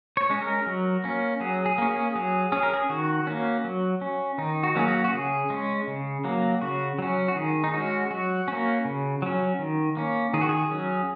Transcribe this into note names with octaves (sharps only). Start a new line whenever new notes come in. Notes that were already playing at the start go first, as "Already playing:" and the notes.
C#5
G#3 C#4
A#4
F#3
A#3 C#4
F#3 G#4
G#4
A#3 C#4
G#4
F#3 G#4
C#4 G#4
A#4
G#4
D#3 F#4
A#3 C#4
F#3
C#4
D#3 D#4
F#4
F#3 A#3 C#4 G#4
F#4
F#4
C#3 G#4
G#3 C#4
C#3
F#3 A#3
C#3 F#4
F#3 C#4
F#4
D#3 G#4
D#4
G#3 C#4 F#4
F#3 F#4
A#3 C#4
C#3
F#3 C#4
D#3
A#3 C#4
D#3 G#4
F#4
G#4
F#3 C#4